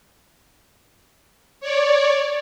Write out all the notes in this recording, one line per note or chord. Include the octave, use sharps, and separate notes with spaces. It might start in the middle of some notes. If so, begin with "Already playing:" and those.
C#5 D5